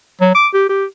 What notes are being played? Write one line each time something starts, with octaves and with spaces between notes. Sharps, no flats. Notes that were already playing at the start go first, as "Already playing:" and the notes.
F#3
D6
G4
G4